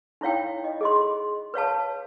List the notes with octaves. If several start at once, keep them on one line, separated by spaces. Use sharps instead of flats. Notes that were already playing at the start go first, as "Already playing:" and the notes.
D#4 E4 C#5 F5 G5
D#5
G#4 D#5 C6
B4 C#5 F5 A5